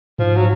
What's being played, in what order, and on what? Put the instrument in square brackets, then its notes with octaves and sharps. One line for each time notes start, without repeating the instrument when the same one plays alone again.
[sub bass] G#2 [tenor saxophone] F3
[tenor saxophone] F#3